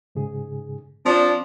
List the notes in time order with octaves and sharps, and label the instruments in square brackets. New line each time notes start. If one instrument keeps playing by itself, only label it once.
[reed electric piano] G#2 C#3 G#4
[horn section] F3 D4 [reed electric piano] C4 D5